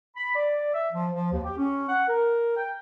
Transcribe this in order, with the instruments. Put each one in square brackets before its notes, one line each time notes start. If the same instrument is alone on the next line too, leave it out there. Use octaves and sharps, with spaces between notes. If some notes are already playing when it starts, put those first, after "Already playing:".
[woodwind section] B5
D5
E5
F3
F3
D#2
G4
C#4
F#5
A#4
G5